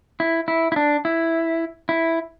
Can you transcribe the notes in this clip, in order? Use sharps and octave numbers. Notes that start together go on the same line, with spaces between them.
E4
E4
E4
D4
E4
E4